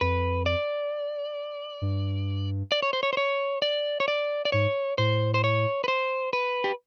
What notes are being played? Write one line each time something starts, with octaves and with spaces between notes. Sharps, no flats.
F2 B4
D5
G2
D5
C#5
C5
C#5
C5
C#5
D5
C#5
D5
D5
G#2 C#5
A2 C5
C5
C#5
B4
C5
B4
G4